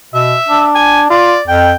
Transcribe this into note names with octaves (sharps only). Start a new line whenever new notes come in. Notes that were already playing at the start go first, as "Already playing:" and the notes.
B2 E5
D4
G#5
F4 D5
F2 G5